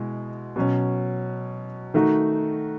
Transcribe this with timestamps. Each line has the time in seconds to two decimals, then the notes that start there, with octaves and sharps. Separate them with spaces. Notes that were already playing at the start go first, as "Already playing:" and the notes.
Already playing: B2 G#3 E4
0.56 B2 F#3 C#4
1.94 D#3 A3 D#4 F#4